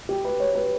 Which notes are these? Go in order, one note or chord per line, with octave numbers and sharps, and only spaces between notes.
G4
B4
C#5
B4